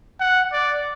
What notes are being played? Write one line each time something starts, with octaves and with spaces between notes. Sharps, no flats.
F#5
D5